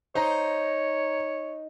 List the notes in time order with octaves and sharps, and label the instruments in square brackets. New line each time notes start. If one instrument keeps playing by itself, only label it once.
[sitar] D#4 [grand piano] C5 A#5 [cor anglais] C#5